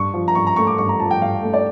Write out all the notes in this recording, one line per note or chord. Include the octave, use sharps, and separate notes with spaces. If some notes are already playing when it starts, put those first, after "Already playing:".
Already playing: G2 C#6
F3
A#5
G2 C#6
A#5
A3 C#6
D6
G2 C#6
A#5
F3 A5
G5
G2 F5
A3
D5